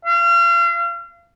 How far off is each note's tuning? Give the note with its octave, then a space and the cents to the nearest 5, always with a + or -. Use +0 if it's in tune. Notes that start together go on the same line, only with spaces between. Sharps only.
F5 -35